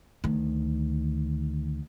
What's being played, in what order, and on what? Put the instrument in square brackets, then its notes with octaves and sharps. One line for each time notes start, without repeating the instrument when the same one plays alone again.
[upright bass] D2 D#3